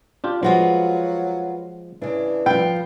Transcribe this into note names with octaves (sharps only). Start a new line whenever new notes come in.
D4 F4 G4
F3 F#3 G#3 F4 F#4 B4
C#3 E3 D4
F3 F4 B4 G5